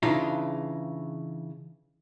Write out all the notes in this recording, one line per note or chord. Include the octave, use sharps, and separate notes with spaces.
C#3 E3 D4 D#4 F4